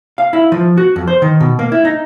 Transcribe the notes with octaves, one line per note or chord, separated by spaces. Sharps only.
F5
E4
F3
F#4
F2
C5
D#3
B2
A#3
E4
D#4